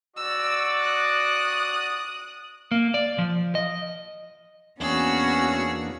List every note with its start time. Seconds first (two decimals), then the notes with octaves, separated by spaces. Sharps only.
0.17 F#4 D5 E6
0.80 D#6 F#6
2.71 A#3
2.94 D5
3.18 F3
3.55 D#5
4.80 E2 A#3 B3 C#4 D4 F#4 G#4 E6